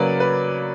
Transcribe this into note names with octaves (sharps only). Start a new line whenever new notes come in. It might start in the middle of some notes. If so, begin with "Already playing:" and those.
Already playing: C#3 F#3 A#3 C#4 B4 D5
B4